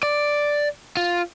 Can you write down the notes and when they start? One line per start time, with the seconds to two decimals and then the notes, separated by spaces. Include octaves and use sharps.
0.03 D5
0.97 F4